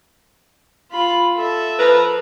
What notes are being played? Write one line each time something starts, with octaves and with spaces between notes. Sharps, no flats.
F4 B5
A4 E5
F3 A#4 B4